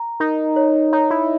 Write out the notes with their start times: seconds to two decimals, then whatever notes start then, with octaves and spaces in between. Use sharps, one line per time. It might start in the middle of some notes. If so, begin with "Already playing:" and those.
Already playing: A#5
0.20 D#4 A#4
0.56 C#5
0.93 D#4 C#5
1.10 E4